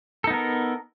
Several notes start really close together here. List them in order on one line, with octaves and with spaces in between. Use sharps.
A4 D#4 B3 A#4